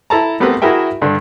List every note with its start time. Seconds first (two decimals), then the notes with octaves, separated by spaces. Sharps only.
0.10 E4 A4 A5 A#5
0.40 A3 B3 C4 G4 A#4 B4
0.62 E4 F#4 G#4 A#4 E5 G5
1.02 G2 D3 D4